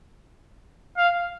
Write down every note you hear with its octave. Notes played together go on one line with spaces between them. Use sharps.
F5